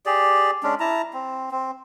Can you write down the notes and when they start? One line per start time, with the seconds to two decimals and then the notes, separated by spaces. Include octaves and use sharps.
0.06 G4 G#4 D5
0.63 G#3 C#4 D4
0.80 E4 A5 A#5
1.13 C4
1.51 C4